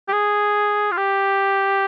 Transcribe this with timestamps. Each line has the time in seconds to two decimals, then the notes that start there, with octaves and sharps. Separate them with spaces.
0.09 G4
0.13 G#4
0.91 F4
0.97 G4